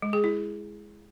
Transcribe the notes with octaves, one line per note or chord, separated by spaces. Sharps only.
G#3
G#4
E4